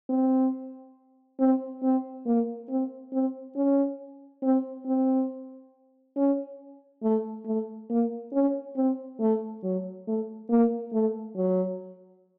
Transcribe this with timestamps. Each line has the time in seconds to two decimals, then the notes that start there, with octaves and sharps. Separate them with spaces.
0.09 C4
1.40 C4
1.83 C4
2.26 A#3
2.69 C4
3.13 C4
3.56 C#4
4.43 C4
4.86 C4
6.17 C#4
7.03 A3
7.46 A3
7.90 A#3
8.33 C#4
8.76 C4
9.20 A3
9.63 F#3
10.07 A3
10.50 A#3
10.93 A3
11.37 F#3